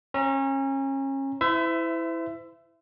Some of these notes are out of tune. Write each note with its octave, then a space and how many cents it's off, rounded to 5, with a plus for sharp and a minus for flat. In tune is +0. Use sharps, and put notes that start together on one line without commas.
C#4 -30 A#5 +0
E4 +0 C5 -40 E5 +15